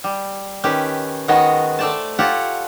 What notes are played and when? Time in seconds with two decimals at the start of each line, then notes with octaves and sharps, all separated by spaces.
0.04 G3
0.64 D#3 C#4 G4 B4
1.28 D#3 G#3 B3 F#4 C#5 D#5
1.79 A3 C5 D5 G5 A5
2.19 F4 G4 A4 C#5 F#5 G#5